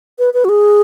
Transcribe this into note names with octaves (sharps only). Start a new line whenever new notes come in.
B4
B4
F#4
G#4